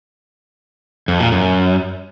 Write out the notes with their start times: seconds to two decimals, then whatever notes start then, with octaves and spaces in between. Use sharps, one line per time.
1.08 F2
1.20 A#2
1.32 F#2